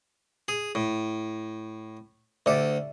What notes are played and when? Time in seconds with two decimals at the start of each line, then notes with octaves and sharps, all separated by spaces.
0.48 G#4
0.75 A2
2.46 D2 A4 D5 E5